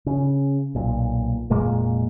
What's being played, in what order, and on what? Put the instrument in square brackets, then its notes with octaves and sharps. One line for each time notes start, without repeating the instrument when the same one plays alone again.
[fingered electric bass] C#3
B1 A#2
F1 A#2 G#3 A#3